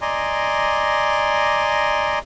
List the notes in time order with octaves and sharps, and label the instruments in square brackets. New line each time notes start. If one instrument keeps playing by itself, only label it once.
[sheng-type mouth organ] D5 D#5 G#5 A#5 C6 D6